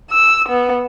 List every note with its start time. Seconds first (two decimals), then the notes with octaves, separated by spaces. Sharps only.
0.11 E6
0.49 B3